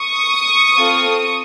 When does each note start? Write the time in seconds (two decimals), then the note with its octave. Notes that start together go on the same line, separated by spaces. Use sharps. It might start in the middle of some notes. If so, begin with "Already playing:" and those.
Already playing: C#6 D#6
0.77 C4 F4 A4